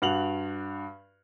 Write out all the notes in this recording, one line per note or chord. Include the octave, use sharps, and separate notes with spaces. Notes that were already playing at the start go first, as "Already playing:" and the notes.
G2 F#4 F7 F#7